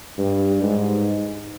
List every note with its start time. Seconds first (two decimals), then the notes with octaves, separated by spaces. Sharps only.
0.18 G2
0.62 G#2